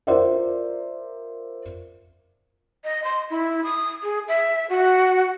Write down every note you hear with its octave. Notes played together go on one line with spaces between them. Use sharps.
F4 A#4 C5 D5 E5
D#5
C6
E4
D#6
G#4
E5
F#4